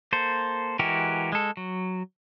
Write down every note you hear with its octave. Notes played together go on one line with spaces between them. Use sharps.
A#3 A4 C5
E3 G#3 F#4 G4 A#4
G#3 A4
F#3